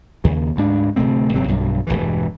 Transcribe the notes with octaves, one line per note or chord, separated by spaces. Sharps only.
D#2 C#3
D2 G#2 D4
D1 C3 A3 C4
G1 C3 F#3 C4
B1 G2 F#3
E1 A#1 G2 E3